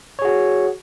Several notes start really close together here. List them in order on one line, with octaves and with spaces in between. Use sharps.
C#5 G#4 F#4